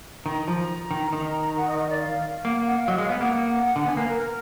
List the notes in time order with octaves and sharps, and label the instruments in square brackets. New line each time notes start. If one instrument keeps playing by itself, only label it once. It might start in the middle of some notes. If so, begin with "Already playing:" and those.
[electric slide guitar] D#3 [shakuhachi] A#5
[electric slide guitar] F3
D#3
D#3
[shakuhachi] F#5
D#5
D#5
D5
F5
[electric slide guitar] A#3 [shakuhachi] F#5
[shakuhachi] F5
F#5
F5
[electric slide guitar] F#3 [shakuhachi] D#5
[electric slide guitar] G#3 [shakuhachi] F5
[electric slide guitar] B3 [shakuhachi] F#5
[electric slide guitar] A#3 [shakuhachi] F#5
[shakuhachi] F#5
[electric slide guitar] D3 [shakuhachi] F#5
[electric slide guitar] B3 [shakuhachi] G#5
[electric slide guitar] A#3 [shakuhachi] B4
[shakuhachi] A#4